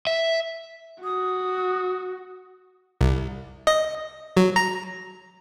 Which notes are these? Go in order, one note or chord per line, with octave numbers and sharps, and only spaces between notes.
E5
F#4 D#6
C2
D#5
F#3
A#5